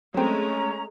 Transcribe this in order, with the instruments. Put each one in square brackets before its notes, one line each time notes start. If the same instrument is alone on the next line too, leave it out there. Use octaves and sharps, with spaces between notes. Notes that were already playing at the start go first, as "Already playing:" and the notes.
[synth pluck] F#3 C4 [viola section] G#3 A3 [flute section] C#4 A#5